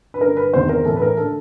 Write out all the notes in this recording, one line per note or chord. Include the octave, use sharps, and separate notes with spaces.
B4
G2 D3 A#4
B4
E2 C3 D#3 C5
A#4
A2 E3 A4
B4
A#4
D3 A4